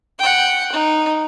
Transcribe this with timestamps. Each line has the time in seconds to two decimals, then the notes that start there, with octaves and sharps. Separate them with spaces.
0.19 F#5 G5
0.72 D#4